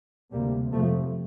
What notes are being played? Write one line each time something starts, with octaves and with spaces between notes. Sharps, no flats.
D2 C3 G3 A#3
F2 C3 F3 A3